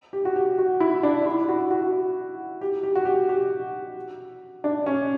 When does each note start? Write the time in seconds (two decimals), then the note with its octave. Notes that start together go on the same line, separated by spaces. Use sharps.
0.13 G4
0.25 F#4
0.36 G4
0.58 F#4
0.80 E4
1.03 D4
1.26 E4
1.48 F#4
1.71 F#4
2.61 G4
2.83 G4
2.95 F#4
3.05 G4
3.29 G4
4.64 D4
4.86 C#4